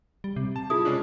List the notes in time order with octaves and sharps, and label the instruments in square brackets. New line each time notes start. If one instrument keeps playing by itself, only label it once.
[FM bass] G3
C3
[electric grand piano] A5
[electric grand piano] E4 [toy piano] F4 G#4 D#6
[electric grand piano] G#3 C#4 D4